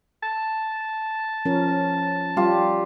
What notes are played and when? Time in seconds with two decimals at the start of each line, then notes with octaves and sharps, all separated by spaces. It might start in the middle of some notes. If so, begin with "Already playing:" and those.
0.23 A5
1.45 F3 C#4 A#4
2.37 G3 F4 G4